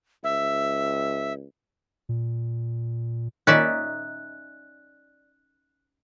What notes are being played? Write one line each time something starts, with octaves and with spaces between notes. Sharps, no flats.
C#2 E5
A#2
A#2 D#3 C#4 D#4 D5 E5 F#6